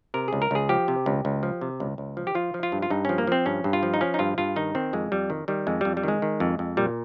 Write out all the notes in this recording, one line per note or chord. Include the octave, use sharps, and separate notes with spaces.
C3 A#4
C#2 G#4
A#4
C#2 G#4
F3 G4
C3
C#2
C#2
F3
C3
C#2
C#2
F3
G4
F3 F4
F3
F4
G2
F4
G2 D#4
F3 C#4
A#3
F3 C4
G2 C#4
G2
F4
F3
D#4
F3 C#4
D#4
G2 F4
G2 F4
D#3 D#4
D#3 C4
F2 G#3
F2 G3
D#3
D#3 G3
F2 G#3
F2 G3
G3
D#3 G#3
D#3
F2
F2
A#2 G3